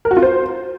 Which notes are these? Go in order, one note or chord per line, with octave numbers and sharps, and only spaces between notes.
A#4
F#4
F4
C5